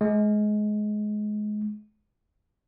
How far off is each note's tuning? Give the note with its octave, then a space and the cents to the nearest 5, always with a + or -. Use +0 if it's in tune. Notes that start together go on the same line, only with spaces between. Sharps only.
G#3 +25